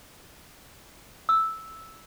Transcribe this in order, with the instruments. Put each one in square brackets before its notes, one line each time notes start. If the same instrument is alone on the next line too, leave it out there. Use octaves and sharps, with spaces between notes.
[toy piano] E6